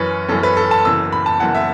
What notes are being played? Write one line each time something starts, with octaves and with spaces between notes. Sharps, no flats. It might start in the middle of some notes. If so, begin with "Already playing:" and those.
Already playing: F#2 E3 C#4 B4
F#2 E3 C#4 A4
B4
A4
A5
F#1 F#2 E3 E6
B5
A5
F#1 F#2 E3 F#5
E5